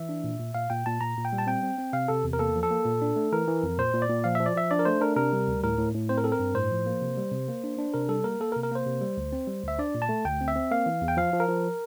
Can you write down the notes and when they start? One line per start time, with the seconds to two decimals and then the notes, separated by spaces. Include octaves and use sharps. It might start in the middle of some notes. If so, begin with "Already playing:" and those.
Already playing: E3 E5
0.09 D4
0.24 A#2
0.39 A#2
0.54 A#2 F5
0.70 A#2 G5
0.86 A#2 A5
1.01 A#2 A#5
1.17 A#2
1.25 G5
1.33 G3
1.38 A5
1.47 C4 G5
1.63 C4
1.78 C4
1.93 C3 F5
2.08 C3 A4
2.24 E2
2.33 A#4
2.39 A#3 A4
2.56 F3
2.63 A4
2.71 A#3
2.85 A#2
3.02 D4
3.16 A3
3.32 E3 A#4
3.48 E3
3.63 F2
3.78 A#2 C5
3.94 A#2
4.02 D5
4.09 A#2
4.24 F3 F5
4.35 F3 E5
4.46 D5
4.56 F3 E5
4.71 D4 D5
4.79 A#4
4.85 A3 C5
5.01 D4 A#4
5.16 C3 A#4
5.33 G3
5.48 D2
5.63 A2 A#4
5.78 A2
5.94 A2
6.09 C4 C5
6.17 A#4
6.24 C4 A4
6.32 A#4
6.39 G2
6.55 A2 C5
6.71 F3
6.86 A#3
7.02 C3
7.17 G3
7.32 C3
7.48 A#3
7.64 D4
7.78 D4
7.94 C3 A#4
8.09 G3 A4
8.24 A#3 A#4
8.40 A#3 A4
8.52 A#4
8.56 C3
8.63 A#4
8.72 A#3 C5
8.86 C3
9.01 G3
9.17 D2
9.33 C4
9.47 G3
9.63 D2 E5
9.79 D4 D5
9.95 A#2
10.02 A5
10.09 A3
10.25 D2 G5
10.41 C4
10.48 E5
10.56 C4
10.71 A#3 F5
10.86 E3
11.02 E2
11.08 G5
11.17 F3 F5
11.33 F3
11.40 A#4
11.49 F3